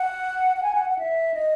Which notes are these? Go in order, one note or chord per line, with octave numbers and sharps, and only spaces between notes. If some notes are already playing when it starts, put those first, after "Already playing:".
Already playing: F#5
F#5
G#5
F#5
F#5
E5
D#5